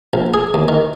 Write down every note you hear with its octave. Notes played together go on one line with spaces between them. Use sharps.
A#1
G#4
D#2
D#3